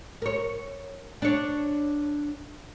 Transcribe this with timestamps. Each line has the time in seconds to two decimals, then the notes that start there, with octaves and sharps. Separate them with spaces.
0.22 A#4 C#5
1.22 D4 C#5